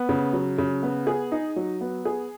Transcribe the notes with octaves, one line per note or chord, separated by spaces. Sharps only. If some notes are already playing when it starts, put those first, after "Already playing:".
Already playing: B3
C#3
F#3
C#3
B3
G#4
D#4
F#3
B3
G#4